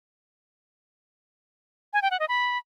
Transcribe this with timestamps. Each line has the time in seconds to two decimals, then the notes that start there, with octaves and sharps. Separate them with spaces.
1.93 G#5
2.02 G5
2.11 F#5
2.20 D#5
2.28 B5